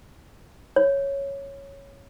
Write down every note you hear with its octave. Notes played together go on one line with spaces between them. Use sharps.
C#5